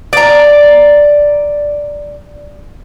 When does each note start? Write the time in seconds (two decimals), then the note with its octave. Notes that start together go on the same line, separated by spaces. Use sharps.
0.13 D5 A#5